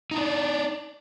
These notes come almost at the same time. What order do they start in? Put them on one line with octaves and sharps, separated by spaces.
D#4 D4 D5